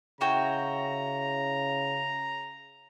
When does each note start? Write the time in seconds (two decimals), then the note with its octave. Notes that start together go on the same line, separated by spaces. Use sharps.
0.21 C#3 E4 F#4 G5 A#5